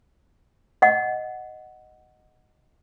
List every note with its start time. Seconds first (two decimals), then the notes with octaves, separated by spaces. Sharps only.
0.82 D#5 F#5